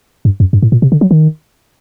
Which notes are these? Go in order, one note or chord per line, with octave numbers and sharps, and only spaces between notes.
G2
F#2
G2
A2
A#2
C3
D3
F#3
D#3